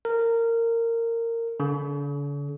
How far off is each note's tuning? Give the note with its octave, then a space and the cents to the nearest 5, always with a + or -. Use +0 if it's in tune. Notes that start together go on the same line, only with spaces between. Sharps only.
A#4 -20
D3 -45